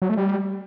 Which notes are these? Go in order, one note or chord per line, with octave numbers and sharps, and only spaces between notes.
F#3
A3
G3